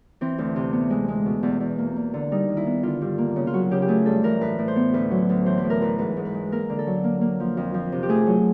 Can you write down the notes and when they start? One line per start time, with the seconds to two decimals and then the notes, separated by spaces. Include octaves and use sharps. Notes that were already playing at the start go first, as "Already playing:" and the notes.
0.21 E3 C4
0.38 D2
0.56 C3
0.73 B3
0.90 G#3
1.08 G#3
1.26 B2
1.43 E2
1.60 E2
1.78 A#3
1.96 A#3
2.14 D3
2.31 G3 D#4
2.49 D#3
2.57 E4
2.66 B3
2.83 D3 F4
3.01 G2
3.18 A#3
3.36 C#3
3.47 F4
3.53 F#3 F#4
3.71 C#3 G4
3.82 G4
3.88 A3 G#4
4.06 G2 A4
4.23 E3 A#4
4.41 A2 B4
4.59 A2
4.68 C5
4.76 B3
4.94 D2 B4
5.11 F#3
5.29 D2
5.46 E3 C5
5.58 B4
5.64 A2
5.70 A#4
5.82 E3 B4
5.99 G#2 B4
6.17 G#2
6.25 B4
6.34 G#3
6.51 A#3 A#4
6.70 D3
6.79 A4
6.87 F#3
7.04 A#3
7.21 A#3
7.40 F3
7.57 F2
7.74 F3
7.92 C3
8.03 G4
8.09 A3 G#4
8.26 F#3